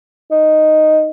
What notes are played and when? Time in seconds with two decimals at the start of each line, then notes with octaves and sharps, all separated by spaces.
0.31 D#4